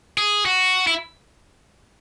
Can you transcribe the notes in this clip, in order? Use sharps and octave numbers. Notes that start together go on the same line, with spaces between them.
G#4
F#4
E4